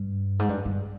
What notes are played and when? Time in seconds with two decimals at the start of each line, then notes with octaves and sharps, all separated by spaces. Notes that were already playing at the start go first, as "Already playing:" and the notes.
Already playing: G2
0.39 G#2
0.49 G2
0.65 G2